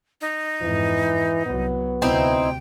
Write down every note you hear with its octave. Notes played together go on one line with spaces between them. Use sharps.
D#4
F2 G#2 E3
C2 F#3 B3
D2 C3 C4 D#4 E4 G5